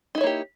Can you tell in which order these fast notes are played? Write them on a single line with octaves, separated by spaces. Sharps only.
D#4 E4 C#5 A#3 G4